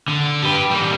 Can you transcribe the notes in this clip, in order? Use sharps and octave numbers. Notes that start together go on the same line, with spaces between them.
D3
G4 B4
G3 A#3